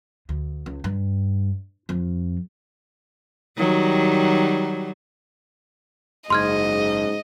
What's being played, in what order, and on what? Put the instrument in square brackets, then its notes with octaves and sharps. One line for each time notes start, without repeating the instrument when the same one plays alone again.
[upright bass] D2
C#2
G2
F2
[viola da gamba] D#3 F#3 G3
[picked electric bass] F#1 [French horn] G#2 [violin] D#5 [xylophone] C6 F6 G#6